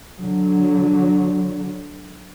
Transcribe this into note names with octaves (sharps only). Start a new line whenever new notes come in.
D3 F#3